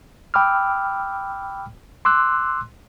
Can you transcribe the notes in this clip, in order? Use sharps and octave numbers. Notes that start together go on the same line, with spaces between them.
G5 B5 D6 E6 F6
C6 D6 E6 F#6